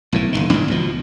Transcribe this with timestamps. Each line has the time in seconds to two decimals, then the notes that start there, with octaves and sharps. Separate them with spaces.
0.12 B1 A2 E3
0.33 F#1 C2 D#3
0.50 D#2 G#2 E3 D4
0.68 C#2 B2 F3